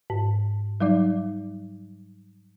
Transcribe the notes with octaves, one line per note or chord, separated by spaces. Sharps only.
G#2
F#3 G3 D#4 D5